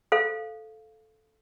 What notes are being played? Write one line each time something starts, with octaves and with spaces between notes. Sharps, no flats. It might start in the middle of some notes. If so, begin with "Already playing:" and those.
A4 C5 F5